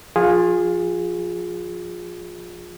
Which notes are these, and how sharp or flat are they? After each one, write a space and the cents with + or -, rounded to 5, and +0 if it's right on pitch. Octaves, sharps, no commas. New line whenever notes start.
F3 +0 F4 +20 G#4 -10